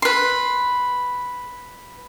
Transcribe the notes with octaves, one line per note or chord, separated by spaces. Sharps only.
B4 C6